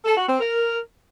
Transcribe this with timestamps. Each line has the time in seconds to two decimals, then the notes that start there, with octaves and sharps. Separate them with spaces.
0.05 A4
0.16 F#4
0.28 C4
0.39 A#4